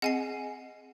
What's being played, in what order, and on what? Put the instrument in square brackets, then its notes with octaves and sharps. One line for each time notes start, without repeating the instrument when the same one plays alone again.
[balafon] C4 G#4 D#5 [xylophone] F#5 G#5 C7